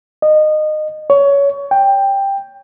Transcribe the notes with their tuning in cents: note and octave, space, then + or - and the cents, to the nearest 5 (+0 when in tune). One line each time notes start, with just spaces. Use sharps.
D#5 -20
C#5 +20
G5 +10